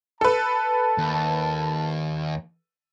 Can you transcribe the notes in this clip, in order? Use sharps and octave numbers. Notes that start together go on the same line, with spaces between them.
A4 B4 A5
D#2